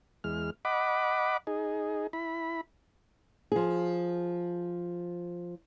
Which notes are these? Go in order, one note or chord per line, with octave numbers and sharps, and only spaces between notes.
E2 G#3 F6
D#5 F#5 B5 D6
D#4 G#4
E4 B5
F3 G#4